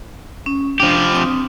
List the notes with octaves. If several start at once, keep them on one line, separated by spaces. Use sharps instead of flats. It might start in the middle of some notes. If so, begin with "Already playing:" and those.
C#4
F3 D4 G4
C4 D#6